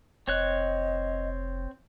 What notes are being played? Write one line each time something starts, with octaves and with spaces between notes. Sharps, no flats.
F1 C4 C#5 D#5 F#6